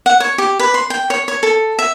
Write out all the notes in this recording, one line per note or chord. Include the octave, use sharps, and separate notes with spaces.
F#5
C#5
G4
B4
C6
G5
C#5
C#5
A4
E5